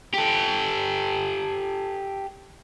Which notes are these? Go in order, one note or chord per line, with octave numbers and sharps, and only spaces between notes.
G4 A4